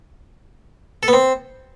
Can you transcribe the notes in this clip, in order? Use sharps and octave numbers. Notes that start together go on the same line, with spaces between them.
A4
B3
C4